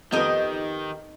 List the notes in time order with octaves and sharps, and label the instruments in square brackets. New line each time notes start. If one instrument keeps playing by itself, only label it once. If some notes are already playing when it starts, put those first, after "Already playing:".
[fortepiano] F2 F3 B3 [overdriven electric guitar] D#3 [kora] D#4 [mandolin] G4 D#5